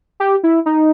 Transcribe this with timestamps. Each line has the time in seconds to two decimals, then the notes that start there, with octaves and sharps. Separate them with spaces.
0.20 G4
0.43 E4
0.66 D#4